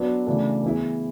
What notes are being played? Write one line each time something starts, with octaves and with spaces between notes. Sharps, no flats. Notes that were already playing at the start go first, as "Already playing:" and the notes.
Already playing: F#3 B3 D4 F#4 B4
C#3 E3 A3 D4
E3 B3 E4 G#4